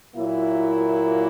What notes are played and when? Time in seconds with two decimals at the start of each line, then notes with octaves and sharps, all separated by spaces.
0.15 A#2 F#3 A#3 E4